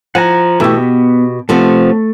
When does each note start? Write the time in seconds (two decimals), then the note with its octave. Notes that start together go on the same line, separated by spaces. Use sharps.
0.15 F3 F#5 G#5 A#5
0.60 B2 E3 A3 E4 G4
0.78 B3
1.49 C3 F3 A3 B3